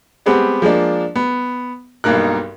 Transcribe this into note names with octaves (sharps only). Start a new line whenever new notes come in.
G3 G#3 B3 C4 G4 F#5
F3 G#3 A#3 D4
B3
B1 G2 A#3 D#4 A#4 F#6